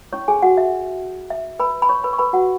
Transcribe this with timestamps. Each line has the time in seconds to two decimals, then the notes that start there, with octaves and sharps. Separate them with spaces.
0.13 C#4 E4 C#5 C#6
0.28 G#4 G#5
0.42 F#4 F#5
0.57 E5
1.30 E5
1.60 B4 B5
1.82 B5
1.89 C#5 C#6
2.04 B4 B5
2.13 C#6
2.18 B4 B5
2.33 F#4 F#5